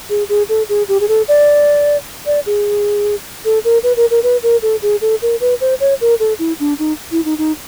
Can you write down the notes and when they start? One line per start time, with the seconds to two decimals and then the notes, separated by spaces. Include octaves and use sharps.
0.10 G#4
0.29 G#4
0.49 A4
0.69 G#4
0.88 G4
1.00 G#4
1.08 A4
1.28 D5
2.26 D5
2.46 G#4
3.45 A4
3.65 A#4
3.83 B4
3.97 A#4
4.11 A#4
4.23 B4
4.43 A#4
4.62 A4
4.82 G#4
5.01 A4
5.22 A#4
5.41 B4
5.61 C5
5.80 C#5
6.01 A#4
6.20 A4
6.39 E4
6.60 D4
6.79 D#4
7.12 E4
7.25 D#4
7.38 D#4